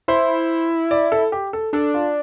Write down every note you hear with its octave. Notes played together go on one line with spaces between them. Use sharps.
E4 C5
D5
A4
G4
A4
D4 A4
F4